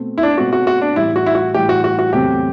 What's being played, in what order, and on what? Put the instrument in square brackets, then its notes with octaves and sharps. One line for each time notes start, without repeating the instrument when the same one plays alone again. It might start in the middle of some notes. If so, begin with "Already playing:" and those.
Already playing: [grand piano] B2 A3 C4
[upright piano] E4
D4
[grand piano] B2 A3 C4 [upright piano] F#4
[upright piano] F#4
F#4
D4
[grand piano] A2 E3 G3 [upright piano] E4
[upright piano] F#4
E4
F#4
[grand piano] A2 E3 G3 [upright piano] G4
[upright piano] F#4
F#4
F#4
[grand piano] E2 C3 F#3 A3 C4 [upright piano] G4